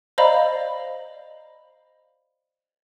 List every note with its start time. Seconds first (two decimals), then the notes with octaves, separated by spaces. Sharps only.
0.18 C5 D5 D#5 F5 A#5 B5